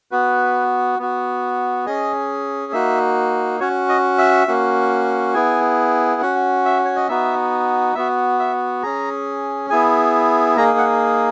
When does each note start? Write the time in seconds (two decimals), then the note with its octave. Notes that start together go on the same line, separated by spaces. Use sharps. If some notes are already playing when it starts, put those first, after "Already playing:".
0.11 B3 F#4 B4
0.99 B3 F#4
1.86 C#4 G#4 D#5
2.72 A#3 D#4 F#4 E5
3.60 C#4 F#4 C#5
3.89 D#5
4.18 E5
4.47 A#3 C#4 F#4
5.34 B3 E4 G#4 G#5
6.21 C#4 F#4 F#5
6.65 E5
6.85 C#5
6.96 D#5
7.09 B3 D#4 F#4 E5
7.95 B3 F#4 E5
8.39 E5
8.82 C#4 G#4 A#5
9.70 B3 E4 G#4 G#5
10.57 A#3 D#4 G#4 A#5
10.78 F#5